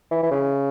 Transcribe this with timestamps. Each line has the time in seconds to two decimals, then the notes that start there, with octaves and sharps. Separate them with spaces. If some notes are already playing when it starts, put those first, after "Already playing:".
0.11 E3
0.23 E3
0.31 C#3